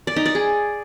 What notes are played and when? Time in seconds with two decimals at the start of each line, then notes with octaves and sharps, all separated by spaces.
0.07 D5
0.16 D#4
0.26 D5
0.35 G#4